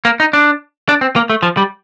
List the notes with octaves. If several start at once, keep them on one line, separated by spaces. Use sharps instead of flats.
A#3
D#4
D4
D4
C4
A#3
A3
F3
G3